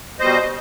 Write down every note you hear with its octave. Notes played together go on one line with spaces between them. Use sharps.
B2 G3 C5 D#5
D#5